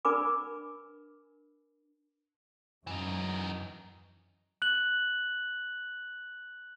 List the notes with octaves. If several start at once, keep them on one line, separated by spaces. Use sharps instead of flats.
D4 A#4 B4 G#5 B5 D6
F#2 E3 D#4
F#6 F#7